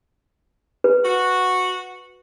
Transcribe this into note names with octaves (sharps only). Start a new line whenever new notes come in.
B4
F#4